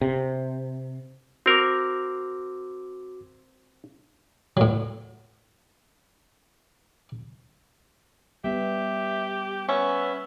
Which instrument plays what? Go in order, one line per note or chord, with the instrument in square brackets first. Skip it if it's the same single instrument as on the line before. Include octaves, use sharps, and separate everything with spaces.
[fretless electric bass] C3
[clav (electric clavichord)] C4 A#4 [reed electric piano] F#4 D6
[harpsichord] A2 F#3
[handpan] G3 B3 [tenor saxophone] G4 [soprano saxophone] E5
[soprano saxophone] B3 [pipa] C#4 [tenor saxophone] E5